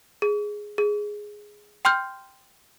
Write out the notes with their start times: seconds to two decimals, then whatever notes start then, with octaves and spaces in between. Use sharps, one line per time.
0.22 G#4
0.78 G#4
1.85 G5 C6 F6 G6